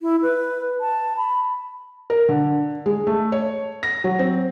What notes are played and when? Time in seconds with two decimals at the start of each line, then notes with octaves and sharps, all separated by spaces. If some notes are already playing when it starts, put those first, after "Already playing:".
0.02 E4
0.22 B4
0.81 A5
1.17 B5
2.10 A#4
2.29 D3
2.86 G#3
3.07 A3
3.32 C#5
3.83 A#6
4.04 F#3
4.19 C4